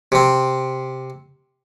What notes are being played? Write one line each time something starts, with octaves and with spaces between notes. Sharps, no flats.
C3 C4